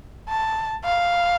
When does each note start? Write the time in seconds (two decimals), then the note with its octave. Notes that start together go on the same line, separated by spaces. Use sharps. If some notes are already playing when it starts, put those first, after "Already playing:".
0.29 A5
0.85 F5